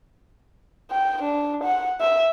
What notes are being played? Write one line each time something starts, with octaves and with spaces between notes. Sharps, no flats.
G5
D4
F#5
E5